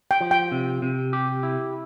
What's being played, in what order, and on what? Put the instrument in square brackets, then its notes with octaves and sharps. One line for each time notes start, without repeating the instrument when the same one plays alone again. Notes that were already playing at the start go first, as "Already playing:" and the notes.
[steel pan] G5
[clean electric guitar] F3
[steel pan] G5
[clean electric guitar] C3
C3
G4
E4